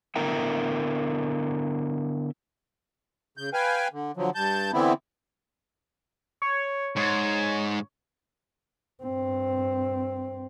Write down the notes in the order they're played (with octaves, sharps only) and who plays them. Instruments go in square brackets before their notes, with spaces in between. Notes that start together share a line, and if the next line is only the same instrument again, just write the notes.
[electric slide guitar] D3 B3 E4 A#4 E5 G5
[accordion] C#3 G6
B4 F5 G5 G#5
D3
D3 F3 F#3
G2 A5 G6
D3 E3 B3 C4 E4
[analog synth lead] C#5
[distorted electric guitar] G#2 [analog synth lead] C#5
[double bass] G2 C4